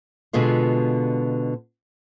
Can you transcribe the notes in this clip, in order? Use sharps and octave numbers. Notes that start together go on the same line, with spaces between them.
B2 D3 G#3 B3 F4